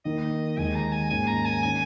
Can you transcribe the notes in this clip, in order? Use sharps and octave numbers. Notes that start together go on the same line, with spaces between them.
D#3 A#3 D#4 A#4 D#5
D#2 D#3 G#3 D#4 G#5
A#5
G#5
G#2 D#3 A#3 C#4 G#5
A#5
G#5
D#3 C#4 A#4 G#5